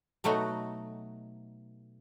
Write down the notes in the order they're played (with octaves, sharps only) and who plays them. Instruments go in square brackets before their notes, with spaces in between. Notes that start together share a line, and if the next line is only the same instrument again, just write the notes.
[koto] B2 F#3 A3 D#4 F#4